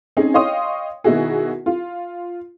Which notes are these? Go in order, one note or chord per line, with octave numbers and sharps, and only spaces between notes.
C4 C#4 D#4 G#4
C#5 D#5 F5 G5 C6 D#6
B2 D#3 D#4 E4 F#4 G#4
F4